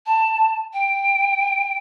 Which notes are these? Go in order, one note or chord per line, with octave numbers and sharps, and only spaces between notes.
A5
G5